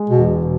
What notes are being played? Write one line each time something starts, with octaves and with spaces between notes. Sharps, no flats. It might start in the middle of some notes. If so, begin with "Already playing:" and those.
Already playing: G#3
B2
E1